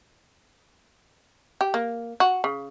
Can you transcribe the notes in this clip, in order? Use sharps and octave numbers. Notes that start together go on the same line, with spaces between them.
G4
A#3
F#4
C#3